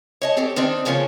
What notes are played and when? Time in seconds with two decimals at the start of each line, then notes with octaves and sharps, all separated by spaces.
0.22 C#5 D#5 A5
0.37 C4 G4 A4 C#5
0.56 D#3 C4 D4 D#4
0.85 E2 C#3 F3 A#3 F4 C#5